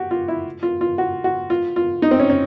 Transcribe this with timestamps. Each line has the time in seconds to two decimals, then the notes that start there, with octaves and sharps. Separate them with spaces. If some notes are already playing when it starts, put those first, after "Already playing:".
Already playing: F#4 G4
0.11 F4
0.28 E4
0.63 F4
0.81 F4
0.98 F#4
1.24 F#4
1.50 F4
1.76 F4
2.02 D#4
2.11 C4
2.20 C#4
2.30 C#4